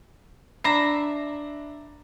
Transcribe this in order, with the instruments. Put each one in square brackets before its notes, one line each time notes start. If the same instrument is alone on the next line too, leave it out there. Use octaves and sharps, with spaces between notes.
[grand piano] D4 B5 C7 [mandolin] E5 A#5